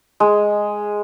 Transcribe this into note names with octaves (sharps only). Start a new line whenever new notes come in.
G#3